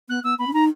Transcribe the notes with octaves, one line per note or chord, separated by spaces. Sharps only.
B3 F#6
B3 E6
B3 B5
C#4
D#4 A#5